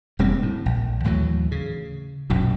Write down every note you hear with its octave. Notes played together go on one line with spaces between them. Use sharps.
E1 G3 A#3 C4
A2
A#1
D#2 A2 E3 F#3
C#3
A#1 F#2 B2